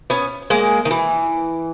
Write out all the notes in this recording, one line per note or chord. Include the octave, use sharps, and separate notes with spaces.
B3 C#4
G#3 A#3
D#3
E3